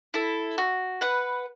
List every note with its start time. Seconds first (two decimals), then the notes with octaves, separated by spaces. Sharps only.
0.14 E4 A4
0.58 F#4
1.01 B4 F#5